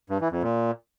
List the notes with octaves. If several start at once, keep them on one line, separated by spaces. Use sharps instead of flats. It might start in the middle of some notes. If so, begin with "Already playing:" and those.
G2
E3
F2
A#2